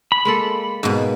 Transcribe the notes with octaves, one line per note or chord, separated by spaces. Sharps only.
B5
G#3 A#3 A4
G#2 B2 A#3